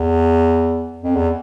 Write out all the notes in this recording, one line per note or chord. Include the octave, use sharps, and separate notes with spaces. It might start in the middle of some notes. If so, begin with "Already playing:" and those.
Already playing: E2
F2
E2